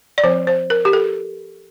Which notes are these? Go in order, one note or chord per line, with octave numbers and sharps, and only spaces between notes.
D5
F3 C4 C5
C5
A#4
G4
A4